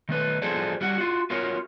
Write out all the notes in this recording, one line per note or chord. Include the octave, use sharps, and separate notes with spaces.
D#3 A3 B4
F3 F#4 G#4 A4 C5 D5
G3 F#4 F#5
F4 F#4
F4 F#4 A#4 C#5